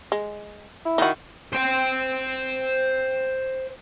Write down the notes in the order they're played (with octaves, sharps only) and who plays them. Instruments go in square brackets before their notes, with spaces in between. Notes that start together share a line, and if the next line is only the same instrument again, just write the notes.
[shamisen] G#3
[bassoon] E4
[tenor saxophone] D#3 [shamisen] D#4 F#4
[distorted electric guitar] C5 G5